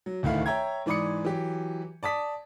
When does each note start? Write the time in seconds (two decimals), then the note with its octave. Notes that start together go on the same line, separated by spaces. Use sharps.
0.06 F#3
0.23 D1 D2 D#3 A3 E4 F5
0.46 C#5 E5 G5 A#5 G#6
0.86 G#2 E3 D5 B5 D#6 C#7
1.25 E3 F#3 G4
2.03 D5 A5 D#6 B6